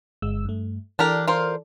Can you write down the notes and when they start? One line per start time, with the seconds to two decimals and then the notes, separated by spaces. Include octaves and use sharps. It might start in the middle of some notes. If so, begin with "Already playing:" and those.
0.22 G1 G#3 E6
0.45 G2 A3
0.99 E3 D4 G4 A4 A#4 D5
1.27 F4 A#4 C5